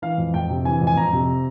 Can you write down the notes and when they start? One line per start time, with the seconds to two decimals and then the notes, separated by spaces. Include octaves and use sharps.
0.02 E3 F5
0.18 F2
0.34 F2 G5
0.50 C3
0.65 E3 G#5
0.81 F2
0.87 G#5
0.97 F2 A#5
1.12 C3